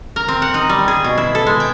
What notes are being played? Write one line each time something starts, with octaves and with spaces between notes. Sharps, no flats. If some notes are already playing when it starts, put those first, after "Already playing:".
A#4
C4
F#5
D#4
G3
G#4
B2
E4
A4
G#3
G5